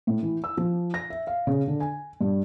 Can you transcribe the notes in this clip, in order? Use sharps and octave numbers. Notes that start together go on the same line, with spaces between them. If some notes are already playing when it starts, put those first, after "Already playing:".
A2
E3
E6
F3
A#6
E5
F5
C#3
D3
G#5
G2